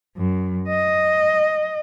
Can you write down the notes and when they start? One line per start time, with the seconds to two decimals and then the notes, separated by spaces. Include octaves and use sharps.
0.17 F#2
0.68 D#5